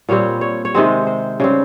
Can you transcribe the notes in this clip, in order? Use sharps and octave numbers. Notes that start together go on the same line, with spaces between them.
A#2 G3 C4 C#5
C#5
C#5
C3 D#3 G#3 C4 C5
C5
C#3 G3 C4